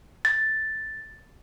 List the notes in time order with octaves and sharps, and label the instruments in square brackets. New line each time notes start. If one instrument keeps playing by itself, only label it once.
[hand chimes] A6